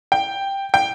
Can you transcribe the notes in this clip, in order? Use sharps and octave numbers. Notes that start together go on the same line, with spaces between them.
G5
G5